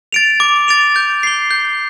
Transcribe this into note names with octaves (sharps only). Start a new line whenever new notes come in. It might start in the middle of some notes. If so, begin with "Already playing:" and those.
A6 D7 F7
D6
A6 D7 F7
G6
C7 G7
G6